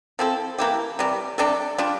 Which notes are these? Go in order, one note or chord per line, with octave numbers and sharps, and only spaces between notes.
F3 C4 E4 A4
E3 A#3 E4 G4
C3 E3 G3
C3 G3 D4 A4
G3 D4 F4